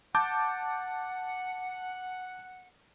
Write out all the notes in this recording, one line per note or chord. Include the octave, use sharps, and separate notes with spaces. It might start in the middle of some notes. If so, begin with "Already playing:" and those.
F#5 A5 D6 G6